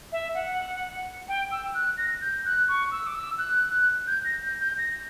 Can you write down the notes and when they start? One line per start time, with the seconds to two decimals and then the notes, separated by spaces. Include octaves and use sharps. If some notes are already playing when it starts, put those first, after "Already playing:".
0.12 E5
0.34 F#5
1.28 G5
1.51 E6
1.74 F#6
1.97 A#6
2.21 G6
2.45 F#6
2.68 C#6
2.91 E6
3.07 D6
3.14 E6
3.38 F#6
4.07 G6
4.25 A#6
4.42 G6
4.60 G6
4.78 A#6